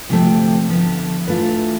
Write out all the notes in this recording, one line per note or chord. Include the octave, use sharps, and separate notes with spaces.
D2 C3 F3 A3 C4 G5
D3 F3 B3 E4
E3 A3 D4 F4 B4